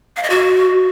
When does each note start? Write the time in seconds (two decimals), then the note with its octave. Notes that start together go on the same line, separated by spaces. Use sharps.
0.16 F5
0.23 D#5
0.30 F#4